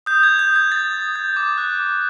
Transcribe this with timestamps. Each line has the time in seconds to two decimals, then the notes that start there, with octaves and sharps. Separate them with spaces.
0.06 D#6 G6
0.23 G#6
0.29 G6
0.39 G6
0.50 D#6
0.56 G#6
0.72 G6 A6
0.93 D#6
1.16 G6
1.37 D6
1.58 F#6
1.80 D6